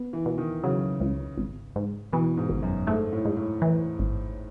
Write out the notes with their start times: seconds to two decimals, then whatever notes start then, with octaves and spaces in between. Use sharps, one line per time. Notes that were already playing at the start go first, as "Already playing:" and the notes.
Already playing: B3
0.13 E3
0.26 B2
0.38 D#3
0.63 C#3 F#3
1.00 C#2
1.37 G#1
1.76 G#2
2.13 B2 E3
2.37 G#2
2.49 G#1
2.63 F#2
2.87 G#2 A3
3.13 A2
3.25 G#2
3.37 A2
3.62 E3
3.99 G#1